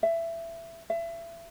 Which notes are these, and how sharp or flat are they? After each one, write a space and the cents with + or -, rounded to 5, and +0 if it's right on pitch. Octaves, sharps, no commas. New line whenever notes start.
E5 +20
E5 +30